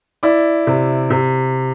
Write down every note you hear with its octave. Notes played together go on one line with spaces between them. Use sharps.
E4 D5
C3
C3